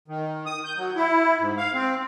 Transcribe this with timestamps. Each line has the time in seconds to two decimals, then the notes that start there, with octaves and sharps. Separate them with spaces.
0.08 D#3
0.46 D#6
0.65 G6
0.77 F#3
0.96 E4
1.40 G#2
1.57 F5
1.74 C4